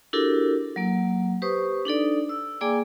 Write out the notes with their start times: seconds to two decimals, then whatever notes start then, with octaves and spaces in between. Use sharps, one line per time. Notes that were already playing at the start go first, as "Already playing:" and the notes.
0.13 D4 E4 F#4 G4 A4 A#4
0.76 F#3 A#3
1.42 G4 B4 C5 C#6 D#6
1.85 D4 D#4 A4 D5
2.29 E6
2.61 A#3 G#4 D5 G5 G#5 D6